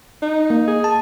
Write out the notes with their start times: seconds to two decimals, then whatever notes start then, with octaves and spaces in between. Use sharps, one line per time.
0.22 D#4
0.50 A#3
0.67 G#4
0.84 A5